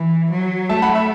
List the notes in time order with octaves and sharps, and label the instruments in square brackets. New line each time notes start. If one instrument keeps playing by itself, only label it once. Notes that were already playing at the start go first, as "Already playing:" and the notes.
Already playing: [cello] E3
F#3
[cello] A3 [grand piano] E5 A5
[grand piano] F#5 B5
E5